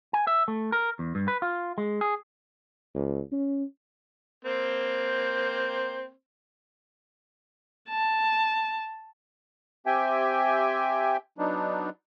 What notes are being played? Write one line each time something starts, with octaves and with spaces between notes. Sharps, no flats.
G#5
E5
A3
A#4
E2
G2
B4
F4
G#3
G#4
C#2
C#4
A#3 C4 C5
A5
C4 G4 E5 G5 G#5
F#3 B3 D4 D#4